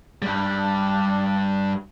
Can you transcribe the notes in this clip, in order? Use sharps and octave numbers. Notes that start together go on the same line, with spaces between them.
G2 G3